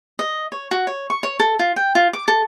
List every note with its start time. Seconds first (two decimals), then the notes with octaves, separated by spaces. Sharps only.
0.19 D#5
0.52 C#5
0.71 F#4
0.87 C#5
1.10 C#6
1.23 C#5
1.40 A4
1.59 F4
1.76 G5
1.95 F4
2.13 D6
2.28 A4